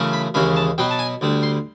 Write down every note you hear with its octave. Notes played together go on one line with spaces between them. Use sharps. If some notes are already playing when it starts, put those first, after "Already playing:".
Already playing: F#2 C#3 E3 A3 C#4
B5
D#2 C#3 E3 G#3 C#4 B5
A5
B2 F#3 B3 G5
A5
G#5
D2 D3 G3
C6